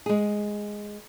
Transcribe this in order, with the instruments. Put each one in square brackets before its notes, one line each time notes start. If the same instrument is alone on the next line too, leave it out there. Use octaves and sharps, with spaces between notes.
[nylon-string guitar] G#3 G#4